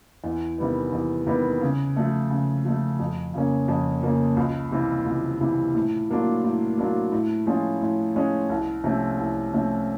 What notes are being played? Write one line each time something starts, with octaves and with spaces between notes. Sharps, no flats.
E2
C3 D#3 G3 B3
E2
C3 D#3 G3 B3
C#3
F3 A3
C#3
F3 A3
F2
C#3 F3 A#3 C#4
F2
C#3 F3 A#3 C#4
C#2
C3 E3 G3
C#2
C3 E3 G3
A2
F#3 A#3 D4 F4
A2
F#3 A#3 D4 F4
A2
F3 G#3 C#4 F4
A2
F3 G#3 C#4 F4
C2
C3 F3 A3 C#4
C2
C3 F3 A3 C#4